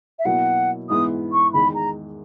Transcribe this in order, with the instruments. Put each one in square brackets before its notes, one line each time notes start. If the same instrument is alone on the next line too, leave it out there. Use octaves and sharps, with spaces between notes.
[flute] E5
[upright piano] B2 F#3 A#3 E4 [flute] F#5
[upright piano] G#2 E3 B3 E4 [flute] D#6
[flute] C#6
[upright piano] E2 D#3 G#3 D#4 [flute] B5
[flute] A#5